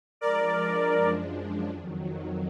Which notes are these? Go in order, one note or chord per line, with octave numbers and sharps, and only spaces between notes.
F3 G#3 D4 A#4 D5
F#2 F3 G#3 D4
F2 D#3 F#3